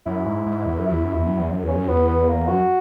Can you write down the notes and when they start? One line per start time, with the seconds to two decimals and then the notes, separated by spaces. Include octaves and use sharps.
0.06 F#2 E4
0.25 G#2
0.46 G#2
0.66 E2
0.78 F#2
0.87 E2 E4
1.04 F#2
1.14 E2 E4
1.27 F#2
1.39 E2
1.51 F#2
1.63 E2 C#4
1.76 F#2
1.88 E2 B3
2.08 B3
2.29 A#3
2.48 F#2 F#4